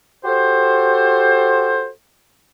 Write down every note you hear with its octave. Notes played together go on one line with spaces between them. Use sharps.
F#4 G4 A4 C5